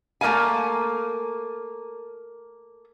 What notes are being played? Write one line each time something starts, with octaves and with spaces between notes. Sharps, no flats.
A3 A#3 A#4 F5 G#5